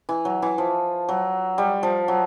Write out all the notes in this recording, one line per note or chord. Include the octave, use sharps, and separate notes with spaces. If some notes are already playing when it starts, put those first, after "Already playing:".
E3
F#3
E3
F3
F#3
G3
F3
F#3